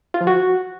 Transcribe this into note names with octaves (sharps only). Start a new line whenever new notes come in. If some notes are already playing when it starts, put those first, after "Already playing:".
F4
F3
F#4